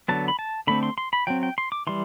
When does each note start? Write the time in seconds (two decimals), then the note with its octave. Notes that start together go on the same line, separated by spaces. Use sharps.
0.08 D3 F#3 B3 A5
0.28 B5
0.39 A5
0.67 D3 A3 C4 B5
0.83 C6
0.98 C6
1.13 B5
1.27 F#3 C4 G5
1.43 G5
1.58 C6
1.72 D6
1.87 E3 G3 C6